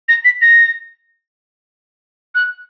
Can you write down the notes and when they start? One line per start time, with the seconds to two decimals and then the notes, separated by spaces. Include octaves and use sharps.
0.09 A#6
0.25 B6
0.42 A#6
2.35 F#6